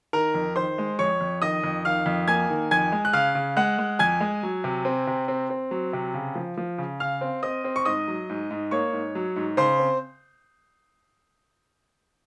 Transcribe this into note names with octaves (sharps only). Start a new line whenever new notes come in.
D#3 A#4 A#5
F2
D#3 C5 C6
G#3
F2 C#5 C#6
F2
D#3 D#5 D#6
F2
D#3 F5 F6
F2
A#3 G#5 G#6
D#3
F2 G#5 G#6
G#3
F#6
C#3 F5 F6
C#3
G#3 F#5 F#6
G#3
F2 G#5 G#6
G#3
F#3
C3
C4
C3
C4
C4
F#3
C3
C#3
F3
F3
C#3
C#3 F5 F6
C4
C4 D#5 D#6
C4
C#6
G#2 D#5 D#6
F#3
G#2
G#2
A#3 C#5 C#6
G#2
F#3
G#2
C#3 C5 C6
C4